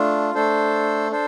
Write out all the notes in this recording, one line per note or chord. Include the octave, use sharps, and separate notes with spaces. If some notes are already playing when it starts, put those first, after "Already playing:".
Already playing: A3 D4 F4
A3 D4 A4 C5
D4 A4 C5